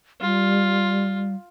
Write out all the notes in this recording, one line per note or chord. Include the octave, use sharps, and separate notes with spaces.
G3 F4